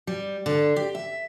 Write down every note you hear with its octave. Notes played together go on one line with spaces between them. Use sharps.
G3
D3
G4
E5